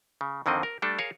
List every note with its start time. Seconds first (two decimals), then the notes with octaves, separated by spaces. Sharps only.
0.21 C#3
0.46 F2 D3 D#3 C4 D#5
0.63 A#4
0.82 G3 A3 D4 A4
0.98 G#4 A#4 C#5 F5